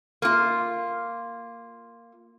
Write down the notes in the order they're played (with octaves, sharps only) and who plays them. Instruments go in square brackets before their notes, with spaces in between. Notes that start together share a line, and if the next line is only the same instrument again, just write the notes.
[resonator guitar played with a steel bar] A#3 F4